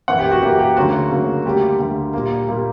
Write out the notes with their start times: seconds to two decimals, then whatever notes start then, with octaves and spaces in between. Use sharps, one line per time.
0.08 F#2 E3 A#3 F#5
0.19 G4
0.31 F#4
0.42 F#2 E3 A#3 G4
0.59 G4
0.77 D2 C#3 F#3 A#3 F#4
1.11 D2 C#3 F#3 A#3
1.45 D2 D3 G3 A#3 G4
1.79 D2 D3 G3 A#3
2.14 A#2 G3 A#3
2.48 A#2 G3 A#3